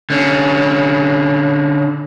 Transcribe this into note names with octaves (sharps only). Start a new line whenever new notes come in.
D3 C#4